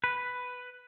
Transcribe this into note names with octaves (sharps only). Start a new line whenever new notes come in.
B4